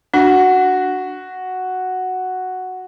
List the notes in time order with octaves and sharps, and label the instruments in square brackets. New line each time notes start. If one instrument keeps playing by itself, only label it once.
[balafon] D4 [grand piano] F#4